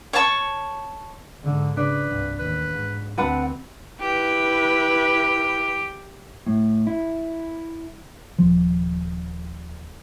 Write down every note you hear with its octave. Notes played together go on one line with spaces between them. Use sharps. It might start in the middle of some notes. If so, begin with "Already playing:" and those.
C#5 F5 A5 C#6
G#2 D3
C#3 D4 B4
C2 G2
A1 D#2 B4
G#2
D2 C4 D4 B4 F#5 B5
E4 G4 B4
A2
E4
D#1 F3